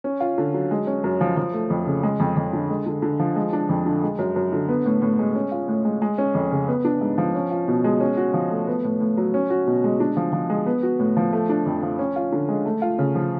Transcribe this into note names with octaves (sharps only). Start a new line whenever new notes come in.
C#4
F4
D3
F#3
G#3
C#4
F#2
F3
F3
A3
F2
C#3
G#3
F2
F2
D3
G#3
D3
D3
F3
G#3
D4
F2
D3
G#3
F#2
F#2
D3
B3
A2
A2
G#3
C#4
F4
A2
G#3
G#3
C#4
F2
C#3
B3
D4
G#2
F3
C#4
F4
B2
G#3
C#4
F#4
F3
A3
B3
A2
A2
F#3
C#4
F#4
B2
G#3
D4
F3
F3
G#3
B3
F#4
A2
F3
A3
D4
F2
F3
C#4
F4
D3
G#3
A3
F4
C#3
F3